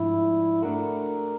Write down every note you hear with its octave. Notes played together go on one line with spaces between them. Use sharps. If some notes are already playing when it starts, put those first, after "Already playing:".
Already playing: G#2 F3 A3 D4 E4
A3 D4 F#4 A#4